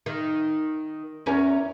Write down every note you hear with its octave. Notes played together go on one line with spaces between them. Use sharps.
D#3
E2 C#4 A#4